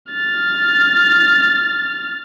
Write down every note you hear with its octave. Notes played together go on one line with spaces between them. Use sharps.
F6 A6